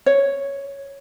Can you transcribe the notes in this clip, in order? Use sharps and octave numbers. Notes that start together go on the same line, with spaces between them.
C#5